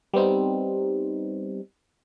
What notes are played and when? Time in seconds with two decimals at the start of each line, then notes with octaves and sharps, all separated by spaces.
0.14 G3 B3 C4 D#4